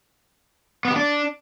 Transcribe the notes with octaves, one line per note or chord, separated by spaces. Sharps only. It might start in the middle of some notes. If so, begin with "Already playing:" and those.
B3
G4
D4